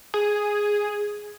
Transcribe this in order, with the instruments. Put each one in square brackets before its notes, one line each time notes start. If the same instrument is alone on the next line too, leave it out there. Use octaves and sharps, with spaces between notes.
[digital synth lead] G#4